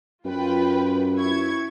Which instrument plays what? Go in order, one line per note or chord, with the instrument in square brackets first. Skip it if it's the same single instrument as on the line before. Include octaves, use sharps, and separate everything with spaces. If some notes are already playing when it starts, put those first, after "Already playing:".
[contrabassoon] F#2 [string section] F4 B4 G5
[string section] E4 C#6 G#6